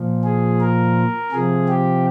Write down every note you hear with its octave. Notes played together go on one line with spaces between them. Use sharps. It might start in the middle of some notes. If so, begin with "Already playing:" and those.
Already playing: A#2 F3
G#4
A#4
C3 F3 G#4
G4